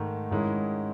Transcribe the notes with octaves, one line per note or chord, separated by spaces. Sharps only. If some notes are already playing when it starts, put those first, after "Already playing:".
Already playing: G#2 D#3 A3
G#2 D#3 G#3 C#4 E4